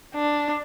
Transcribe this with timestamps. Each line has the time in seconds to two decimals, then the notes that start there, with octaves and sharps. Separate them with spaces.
0.15 D4